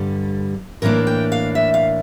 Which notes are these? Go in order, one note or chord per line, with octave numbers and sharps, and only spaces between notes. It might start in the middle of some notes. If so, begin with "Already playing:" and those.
Already playing: G2 D3 G3 A4
A2 E3 A#3 D4 A#4
G5
F5
E5
F5